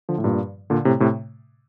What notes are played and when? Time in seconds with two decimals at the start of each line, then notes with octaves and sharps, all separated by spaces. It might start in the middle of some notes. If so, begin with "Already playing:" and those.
0.09 D3 F3
0.18 A2
0.24 G2 A#2
0.70 A#2 D3
0.85 A2 C3
1.00 A2 C3